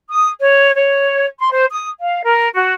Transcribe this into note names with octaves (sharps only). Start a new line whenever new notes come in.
D#6
C#5
C#5
C6
C5
D#6
F5
A#4
F#4